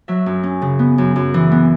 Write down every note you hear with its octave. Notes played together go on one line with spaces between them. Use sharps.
F#3 E5
F#2
C#4
C#3
B3
F#2
F#2
E3
B3